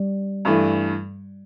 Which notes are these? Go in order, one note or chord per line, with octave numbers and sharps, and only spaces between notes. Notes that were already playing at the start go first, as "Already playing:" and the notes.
Already playing: G3
G2 E3 A3